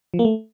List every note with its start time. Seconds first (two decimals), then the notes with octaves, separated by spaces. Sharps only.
0.14 F3
0.19 A#3
0.25 A3